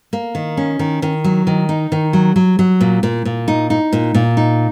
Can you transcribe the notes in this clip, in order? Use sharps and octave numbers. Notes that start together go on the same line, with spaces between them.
A#3
D#3
C#4
D#3
D#3
F#3
D#3
D#4
D#3
F#3
F#3
F#3
A#2
A#2
A#2
D#4
D#4
A#2
A#2
D#4